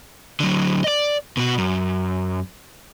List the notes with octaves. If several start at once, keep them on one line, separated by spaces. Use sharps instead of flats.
D3 F#3
D5 D#5
B2 F#4
F#2